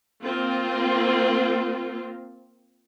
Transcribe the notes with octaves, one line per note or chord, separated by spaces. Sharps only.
A#3 C4 F4